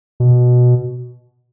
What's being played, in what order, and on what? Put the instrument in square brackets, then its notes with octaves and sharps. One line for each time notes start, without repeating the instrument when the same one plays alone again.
[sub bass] B2